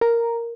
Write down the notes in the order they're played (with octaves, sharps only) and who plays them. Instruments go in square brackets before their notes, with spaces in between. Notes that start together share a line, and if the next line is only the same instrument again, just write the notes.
[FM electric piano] A#4